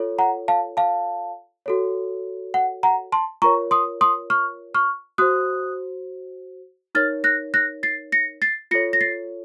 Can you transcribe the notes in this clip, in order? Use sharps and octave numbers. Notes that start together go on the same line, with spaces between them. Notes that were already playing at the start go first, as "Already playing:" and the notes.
Already playing: F4 A4 C#5
F#5 A#5
F5 A5
F5 A5
F#4 A4 C#5
F#5
F#5 A#5
A5 C6
F4 A#4 C#5 A#5 C#6
C6 D#6
C6 D#6
C#6 F6
C#6 F6
F#4 C5 D#6 F#6
D#4 A#4 C#5 F6 A6
F#6 A#6
F#6 A#6
A6 C7
A#6 C#7
A6 C7
F4 A4 C#5 A#6 C#7
A#6
A6 C7